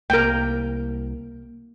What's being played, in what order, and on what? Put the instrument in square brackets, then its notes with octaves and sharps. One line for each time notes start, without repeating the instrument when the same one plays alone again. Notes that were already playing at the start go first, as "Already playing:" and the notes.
[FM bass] C2 [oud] A#3 [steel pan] A#4 G5